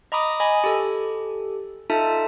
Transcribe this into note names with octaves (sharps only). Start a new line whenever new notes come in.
D#5 A#5 B5 D6 D#6
D#5 G#5 B5
G4 A4
D#4 F4 A4 E5 A5